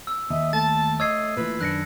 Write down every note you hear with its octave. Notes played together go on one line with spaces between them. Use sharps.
E6
D#2 D#5 E5
A3 A5 A6
C#5 D#5 E6 G#6 C7
A#2 E3 B4
F#2 D#3 D4 F#6 A#6 C#7